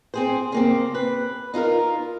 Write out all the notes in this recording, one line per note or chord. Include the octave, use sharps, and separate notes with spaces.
C4 G#4 C5
C#3 A#3 C4
B4
D#4 F4 A4 A#4